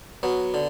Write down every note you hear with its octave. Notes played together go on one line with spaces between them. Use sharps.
F#3 B3
D3